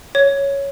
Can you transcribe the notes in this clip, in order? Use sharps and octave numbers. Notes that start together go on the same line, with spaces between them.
C#5